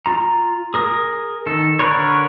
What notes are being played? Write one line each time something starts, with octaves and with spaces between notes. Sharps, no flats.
F4 A#5
G#4 A#4 D#6
D#3 A4
D3 D4 A#4 B4 C#5